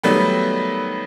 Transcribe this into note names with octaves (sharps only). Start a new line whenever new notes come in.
D#3 F#3 G3 A3 B3